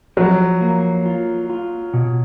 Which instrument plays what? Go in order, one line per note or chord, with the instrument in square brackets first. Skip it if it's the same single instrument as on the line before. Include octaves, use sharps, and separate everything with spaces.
[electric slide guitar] F3 [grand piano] F#3
[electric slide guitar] A#3
F4
F4
B2